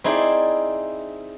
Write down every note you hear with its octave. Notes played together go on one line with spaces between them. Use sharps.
C4 D#4 E4 G#4 D5